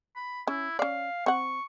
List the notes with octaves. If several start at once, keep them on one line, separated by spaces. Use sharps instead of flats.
B5
C#4 E4
C#4 D5 F5
C4 F#5 C#6